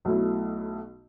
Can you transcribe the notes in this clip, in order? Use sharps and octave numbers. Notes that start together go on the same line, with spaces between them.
B1 B2 F#3 A3 E4